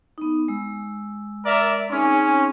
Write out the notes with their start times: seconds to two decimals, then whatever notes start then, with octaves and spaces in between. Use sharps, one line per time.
0.18 B3 D#4
0.48 G#3 E6
1.46 A#4 D5 E5
1.90 C4 C#4 D#4 G#4